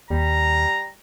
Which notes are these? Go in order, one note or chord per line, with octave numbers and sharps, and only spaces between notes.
D#2 G3 A#5